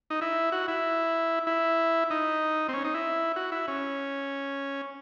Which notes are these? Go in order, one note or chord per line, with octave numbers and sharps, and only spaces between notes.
D#4
E4
F#4
E4
E4
D#4
C4
C#4
D#4
E4
F#4
E4
C#4